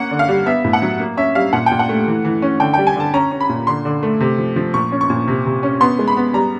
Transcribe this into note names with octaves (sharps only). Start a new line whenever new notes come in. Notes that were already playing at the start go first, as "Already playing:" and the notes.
Already playing: A#3 C#4 F#5
D3
F5
G3
B3 E5
A2
F#5
F#3
A#3
C#4 E5
G3 F5
A#2 F#5
G5
A#2
F#5
A3
E3
E3
C#4
D3 G5
G3 G5
G#5
D3 A5
C#4 A#5
C#4
B5
A#2
D3 C6
D3
A3
C3
F3
F3
A#2 C#6
C#4
C#6
A#2
C3
C3
C#4
B3 C6
G#3
B5
B3
G3 A#5